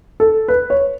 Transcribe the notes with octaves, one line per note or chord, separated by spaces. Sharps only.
A4
B4
C#5